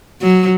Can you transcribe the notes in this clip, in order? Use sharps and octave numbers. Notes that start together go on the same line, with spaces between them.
F#3